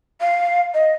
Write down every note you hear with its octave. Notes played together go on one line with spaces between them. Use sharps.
F5
D#5